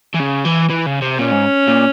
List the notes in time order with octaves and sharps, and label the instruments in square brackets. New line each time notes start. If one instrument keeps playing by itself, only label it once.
[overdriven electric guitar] E3
C#3
E3
E3
C#3
C3
[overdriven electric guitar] A#2 [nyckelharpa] C#4
[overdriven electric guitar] G#2
A#2